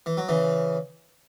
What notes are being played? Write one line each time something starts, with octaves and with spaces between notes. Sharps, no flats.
E3
F#3
C#3 E3